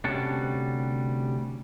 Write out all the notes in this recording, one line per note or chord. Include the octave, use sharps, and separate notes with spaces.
D2 C3 G3 C#4 F#5 A5